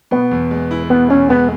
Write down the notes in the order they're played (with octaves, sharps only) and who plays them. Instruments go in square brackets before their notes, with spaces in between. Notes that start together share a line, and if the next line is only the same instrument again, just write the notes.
[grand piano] B2 [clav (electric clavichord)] B3
[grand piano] E2
G#3
E4
[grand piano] B2 [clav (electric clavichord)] B3
[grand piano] E2 [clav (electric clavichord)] C#4
[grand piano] G#3 [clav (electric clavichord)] B3